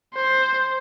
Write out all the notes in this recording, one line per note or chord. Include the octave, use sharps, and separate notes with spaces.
C5